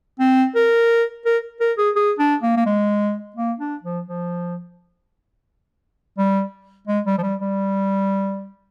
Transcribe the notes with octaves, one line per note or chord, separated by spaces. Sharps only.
C4
A#4
A#4
A#4
G#4
G#4
D4
A#3
A#3
G#3
A#3
D4
F3
F3
G3
G#3
G3
F3
G3
G3